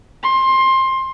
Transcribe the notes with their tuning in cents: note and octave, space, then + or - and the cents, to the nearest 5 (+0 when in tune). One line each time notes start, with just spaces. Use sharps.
C6 +20